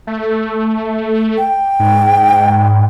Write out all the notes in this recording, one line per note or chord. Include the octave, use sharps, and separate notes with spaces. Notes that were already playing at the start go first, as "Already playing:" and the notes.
A3
G5
G#2